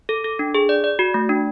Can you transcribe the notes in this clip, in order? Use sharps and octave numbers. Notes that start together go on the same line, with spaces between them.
A4
A4
D4
G#4
D5
D5
F#4
A3
D4